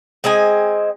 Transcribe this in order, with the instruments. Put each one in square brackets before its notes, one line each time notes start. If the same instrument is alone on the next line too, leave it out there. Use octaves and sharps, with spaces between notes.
[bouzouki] G#3 C4 D#5 G#5